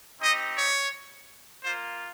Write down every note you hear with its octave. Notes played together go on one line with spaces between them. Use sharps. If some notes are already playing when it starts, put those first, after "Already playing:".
C4 D#4 G4 D#5
C#5
A#3 F4 C5